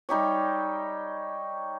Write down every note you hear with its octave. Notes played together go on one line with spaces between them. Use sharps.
G3 D#4 G4 C#5